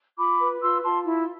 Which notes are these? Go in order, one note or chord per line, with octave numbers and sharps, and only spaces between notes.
F4 B5 D6
B4
F4 C6 E6
F4 A5 C6
E4